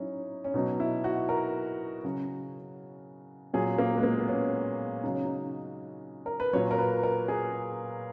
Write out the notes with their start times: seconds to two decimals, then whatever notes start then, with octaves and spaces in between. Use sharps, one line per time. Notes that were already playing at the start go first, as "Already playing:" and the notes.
Already playing: F#3 C#4 D#4 E4
0.44 C#4
0.54 B2 D#4
0.58 F#3
0.80 E4
1.04 F#4
1.29 A#4
2.04 C#3 F#3
3.54 A#2 F#3 G#4
3.78 A#3
3.97 G#3
4.03 A#3
4.19 B3
4.28 C#4
5.03 C#3 F#3 D#4
5.15 C#4
5.25 D#4
6.26 A#4
6.40 B4
6.53 A#2 F#3 C#5
6.71 A#4
6.78 B4
7.03 A#4
7.28 G#4